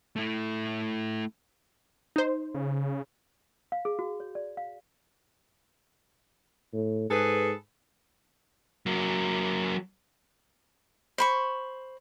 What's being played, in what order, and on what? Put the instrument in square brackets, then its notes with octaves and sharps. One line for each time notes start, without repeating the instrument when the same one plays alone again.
[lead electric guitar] A3 E4
[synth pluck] D#4 C5
[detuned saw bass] C#3
[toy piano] F5
G#4
F#4
C#5
D5
F5
[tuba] A2
[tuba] G#2 [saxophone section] G#4 A4 B4
[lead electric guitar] F#3 A#3
[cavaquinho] C5 B5 C#6